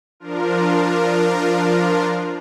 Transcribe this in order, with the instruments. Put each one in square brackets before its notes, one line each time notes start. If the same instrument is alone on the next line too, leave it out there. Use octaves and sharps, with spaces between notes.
[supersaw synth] F3 D4 F4 A#4